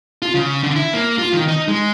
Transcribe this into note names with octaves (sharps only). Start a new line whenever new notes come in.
F4
C#3
D3
E4
A#3
F4
D#3
D#4
G#3